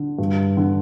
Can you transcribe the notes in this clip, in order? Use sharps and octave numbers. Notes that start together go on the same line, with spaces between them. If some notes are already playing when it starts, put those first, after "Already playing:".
Already playing: D3
G2
D3